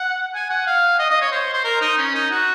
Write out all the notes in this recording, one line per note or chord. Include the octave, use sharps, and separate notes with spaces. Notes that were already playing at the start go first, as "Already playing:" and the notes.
Already playing: F#5
G#5
F#5
F5
D#5
D#5
C#5
C5
C5
A#4
D#4
C#4
D#4
F#4